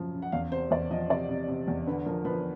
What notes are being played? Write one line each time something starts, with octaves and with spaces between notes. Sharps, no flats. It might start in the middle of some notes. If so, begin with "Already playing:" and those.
Already playing: F#2 C#3 F3
C#3
F#5
E2 F5
C3 C5
E2 D5
F3 D#5
C3 D5
C3
C3
E2
D3 B4
F3 A#4
F3 B4